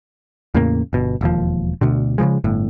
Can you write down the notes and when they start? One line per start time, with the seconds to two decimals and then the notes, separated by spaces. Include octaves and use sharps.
0.54 E2 A2 C#3 A#3
0.93 G1 B2
1.21 E1 D#2 F3
1.81 D2 B2 D3
2.18 C#3 E3 F3 G#3
2.44 G1 A2